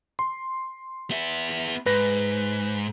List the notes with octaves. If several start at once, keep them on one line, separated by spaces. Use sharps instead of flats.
C6
B3 E5
G#2 B4 A#6